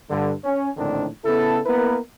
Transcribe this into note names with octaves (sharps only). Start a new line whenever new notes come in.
G2 D3
C#4
A#1 A2 D3 D#3 C4 D4
C#3 B3 E4 A4
A#3 B3 E4 A#4 B4